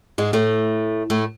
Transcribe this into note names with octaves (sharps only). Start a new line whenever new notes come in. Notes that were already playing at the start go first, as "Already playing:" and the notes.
G#2 G#3
A2 A3
A2 A3